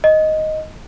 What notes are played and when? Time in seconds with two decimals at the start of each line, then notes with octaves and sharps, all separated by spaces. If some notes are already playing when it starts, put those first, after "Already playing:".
0.04 D#5